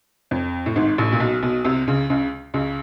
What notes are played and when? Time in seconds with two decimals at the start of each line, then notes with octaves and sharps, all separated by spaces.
0.31 F2
0.66 A2
0.76 G#1 G#2
0.98 A1 A2
1.13 A#2
1.20 B1 B2
1.43 B1 B2
1.65 C2 C3
1.87 C#2 C#3
2.10 C#2 C#3
2.54 C#2 C#3